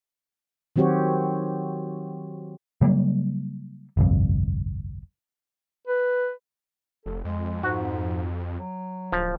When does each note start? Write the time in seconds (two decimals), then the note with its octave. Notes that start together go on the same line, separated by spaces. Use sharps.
0.76 D#3 F#3 C4 F#4 G4 C#5
2.81 C#3 F#3 G3 A#3
3.97 G1 C2 F2
5.87 B4
7.06 F1 A4
7.25 F2 G#3
7.63 G#2 F#4
8.58 F#3
9.12 D1 F3